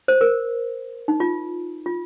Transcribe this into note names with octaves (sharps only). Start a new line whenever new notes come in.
C5
A#4
D#4
F4
F4